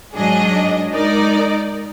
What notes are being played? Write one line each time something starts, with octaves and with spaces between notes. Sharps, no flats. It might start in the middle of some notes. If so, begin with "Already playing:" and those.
G#2 F#3 D4 G#4 D#5
G#3 D#4 A#4 D5